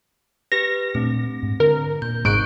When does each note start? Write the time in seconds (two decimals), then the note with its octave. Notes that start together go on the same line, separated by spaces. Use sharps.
0.52 G4 B4 A#6
0.95 A#2 A3 C4 D4
1.43 G#2
1.60 D3 A#4
2.02 A#2 G6
2.25 G#1 G#2 C3 C#6 F#6 G6 D7